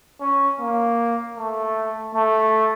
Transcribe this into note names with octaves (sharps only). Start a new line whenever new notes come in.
C#4
A#3
A3
A3